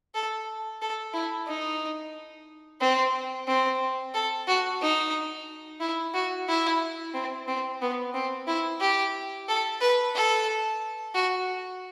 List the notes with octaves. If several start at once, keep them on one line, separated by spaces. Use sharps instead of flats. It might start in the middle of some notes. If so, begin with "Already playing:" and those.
A4
A4
E4
D#4
C4
C4
A4
F#4
D#4
E4
F#4
E4
C4
C4
B3
C4
E4
G4
A4
B4
A4
F#4